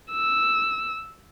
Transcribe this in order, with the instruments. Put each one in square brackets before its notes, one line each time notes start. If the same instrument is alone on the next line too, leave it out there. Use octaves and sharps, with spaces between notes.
[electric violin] E6